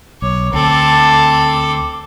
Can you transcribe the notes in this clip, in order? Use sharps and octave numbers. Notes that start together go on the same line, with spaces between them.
B1 C#5 D6
D2 C4 A4 A5